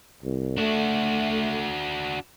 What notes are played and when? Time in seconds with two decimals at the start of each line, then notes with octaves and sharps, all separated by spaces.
0.22 C2
0.58 A3 D4 F#4